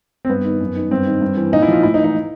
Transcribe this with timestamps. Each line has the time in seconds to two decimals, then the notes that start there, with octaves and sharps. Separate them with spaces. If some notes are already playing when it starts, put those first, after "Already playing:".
0.25 C4
0.29 G2 B3
0.45 D#3
0.60 F#2
0.76 D#3
0.91 G2 C4
1.06 D#3
1.21 G2
1.37 E3
1.52 A#2 D#4
1.62 E4
1.68 F3 F4
1.83 A2 E4
1.94 D#4
1.99 E3
2.04 D#4